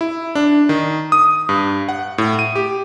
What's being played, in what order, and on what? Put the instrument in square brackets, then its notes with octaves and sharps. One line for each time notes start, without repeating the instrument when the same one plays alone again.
[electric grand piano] E4
D4
D#3
D#6
G2
F#5
A2
D#7
G4